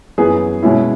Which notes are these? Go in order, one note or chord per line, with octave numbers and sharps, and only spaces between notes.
F#2 E3 B3 G#4
B2 G#3 C#4 E4